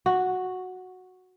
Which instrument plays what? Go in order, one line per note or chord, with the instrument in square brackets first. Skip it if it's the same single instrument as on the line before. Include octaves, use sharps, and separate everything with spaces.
[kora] F#4